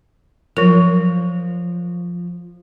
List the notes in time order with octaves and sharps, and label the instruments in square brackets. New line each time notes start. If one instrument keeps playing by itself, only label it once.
[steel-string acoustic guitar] F3 [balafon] F#3 A#4